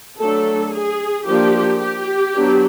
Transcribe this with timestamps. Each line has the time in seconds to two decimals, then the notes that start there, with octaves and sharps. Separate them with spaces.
0.19 F#3 A3 D4 A4
0.73 G#4
1.27 F3 A#3 D4 G4
1.80 G4
2.35 F#3 B3 D4